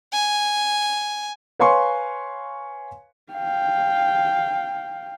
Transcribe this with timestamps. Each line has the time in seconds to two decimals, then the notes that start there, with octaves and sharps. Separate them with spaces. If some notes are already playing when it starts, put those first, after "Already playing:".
0.13 G#5
1.59 B4 C#5 F5 G#5 C6 C#6
3.32 F5 G5